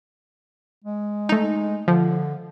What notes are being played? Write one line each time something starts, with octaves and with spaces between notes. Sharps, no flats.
G#3
A3 D#4
D3 F3